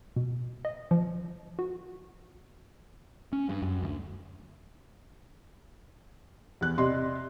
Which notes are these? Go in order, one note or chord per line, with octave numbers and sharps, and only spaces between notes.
B2
D#5
F3
F#4
C#4
G2
F#2
D2
E2 F#6
C3 D5 D#5 C6